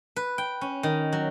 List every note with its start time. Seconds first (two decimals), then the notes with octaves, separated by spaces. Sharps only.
0.16 B4
0.38 G5
0.61 C#4
0.83 D#3
1.13 F#3